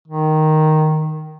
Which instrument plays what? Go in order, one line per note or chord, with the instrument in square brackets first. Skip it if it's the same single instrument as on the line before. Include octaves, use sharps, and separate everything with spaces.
[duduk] D#3